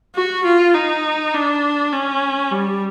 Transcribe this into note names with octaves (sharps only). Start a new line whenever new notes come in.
F#4
F4
D#4
D4
C#4
G3